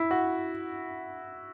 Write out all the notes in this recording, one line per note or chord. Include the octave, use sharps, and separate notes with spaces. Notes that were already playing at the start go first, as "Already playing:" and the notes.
Already playing: E4
F#4